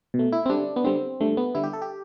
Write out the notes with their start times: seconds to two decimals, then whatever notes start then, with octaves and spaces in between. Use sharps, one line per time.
0.14 B2
0.19 A3
0.33 E4
0.46 C4
0.50 D3 G3 D4
0.76 B3
0.84 D3 G3 C4
1.21 D3 G3 A3
1.37 B3
1.55 D3 G3 E4
1.63 G4
1.73 A4
1.82 G4